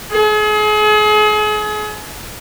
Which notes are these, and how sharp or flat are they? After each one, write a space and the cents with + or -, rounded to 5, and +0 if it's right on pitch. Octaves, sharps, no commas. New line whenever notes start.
G#4 +35